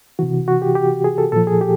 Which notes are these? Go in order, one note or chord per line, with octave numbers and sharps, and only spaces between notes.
C3 E3 F#4
F#4
G4
G4
G#4
A4
A#2 F3 A4
G#4
G4